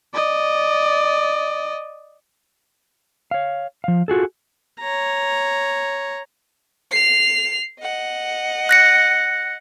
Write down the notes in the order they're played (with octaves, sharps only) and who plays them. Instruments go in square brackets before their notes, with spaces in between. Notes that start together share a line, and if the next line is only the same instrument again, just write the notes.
[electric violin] D5 D#5
[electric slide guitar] C#5 F5
F3 F5
F4 F#4 G#4 A4
[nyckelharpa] C#5 A#5
[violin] C7 F7
D#5 F#5
[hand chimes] F#6 A#6 C#7